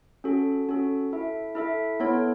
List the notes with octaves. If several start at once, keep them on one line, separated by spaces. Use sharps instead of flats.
C#4 F#4 A4
C#4 F#4 A4
E4 A4 E5
E4 A4 E5
B3 E4 A4 C#5